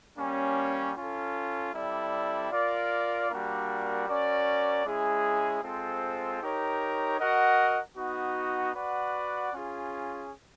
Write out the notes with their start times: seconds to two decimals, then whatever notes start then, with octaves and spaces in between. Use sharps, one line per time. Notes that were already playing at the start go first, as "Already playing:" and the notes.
0.18 G3 A#3 C#4
0.96 C#4 F4 A4
1.73 G3 C4 E4 A4 D5
2.52 F4 A#4 D5
3.30 G3 A#3 D4 F#4 A#4
4.08 C#4 F#4 A#4 D5
4.85 G#3 C#4 E4 G#4
5.63 G#3 C4 F4 A4 C5
6.41 D#4 G4 A#4 C#5
7.20 F#4 A#4 D#5 F#5
7.97 B3 D#4 F#4
8.75 F#4 B4 D5 F#5
9.53 C#4 F4 G#4